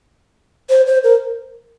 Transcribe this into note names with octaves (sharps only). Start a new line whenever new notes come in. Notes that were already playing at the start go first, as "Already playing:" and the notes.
C5
C5
A#4